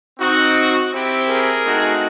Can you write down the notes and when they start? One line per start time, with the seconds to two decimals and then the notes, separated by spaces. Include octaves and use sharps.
0.20 C4 D#4 F#4
0.92 C4 E4 G4
1.28 G#4 A#4
1.63 A3 C4 D#4 F#4